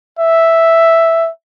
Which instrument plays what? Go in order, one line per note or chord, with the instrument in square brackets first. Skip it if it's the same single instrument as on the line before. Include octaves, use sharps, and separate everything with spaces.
[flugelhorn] E5